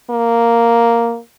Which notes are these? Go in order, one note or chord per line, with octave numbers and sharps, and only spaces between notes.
A#3